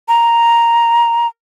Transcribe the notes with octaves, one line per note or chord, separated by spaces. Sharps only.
A#5